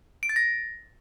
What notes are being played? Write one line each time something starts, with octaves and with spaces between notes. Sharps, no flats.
D7
A6
A#6